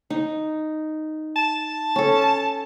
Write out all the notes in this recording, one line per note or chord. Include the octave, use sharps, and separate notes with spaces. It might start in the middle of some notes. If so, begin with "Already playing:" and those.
D#4
A5
C#4 A4